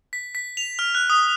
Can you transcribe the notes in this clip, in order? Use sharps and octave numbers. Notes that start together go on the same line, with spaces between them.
B6
B6
F7
F6
F#6
D#6